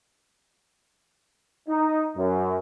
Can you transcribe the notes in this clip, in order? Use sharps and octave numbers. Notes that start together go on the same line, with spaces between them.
D#4
F#2